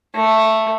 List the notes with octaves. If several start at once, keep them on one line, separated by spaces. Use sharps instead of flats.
A3